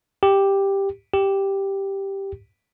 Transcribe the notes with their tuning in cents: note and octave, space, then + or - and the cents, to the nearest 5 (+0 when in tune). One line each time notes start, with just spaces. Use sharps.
G4 +5
G4 +0